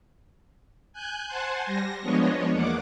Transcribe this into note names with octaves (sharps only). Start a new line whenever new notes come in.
G#5 F#6 G6
C5 F#5 G#5 A5 C6
G3 A#6
F3 G#3 B3 D4 C#5 D#5
E2 A#3 F#5 D6